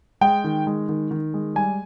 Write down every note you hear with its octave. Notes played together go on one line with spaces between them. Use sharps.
G#3 G5
D#3
G#3
D#3
D#3
G#3
G3 G#5